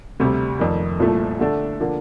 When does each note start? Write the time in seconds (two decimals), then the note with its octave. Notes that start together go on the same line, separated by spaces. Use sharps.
0.20 D2 C3 G3
0.59 F1 F2 D#3
1.00 C2 A#2 F3 A3
1.39 D3 A3 D4 A4
1.80 D3 F3 A#3 D4